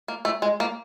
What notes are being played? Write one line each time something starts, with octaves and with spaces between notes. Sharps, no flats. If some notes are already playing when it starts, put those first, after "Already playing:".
A#3
A3
G#3
A#3